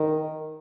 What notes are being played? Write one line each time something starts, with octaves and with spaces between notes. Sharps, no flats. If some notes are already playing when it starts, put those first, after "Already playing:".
Already playing: D#3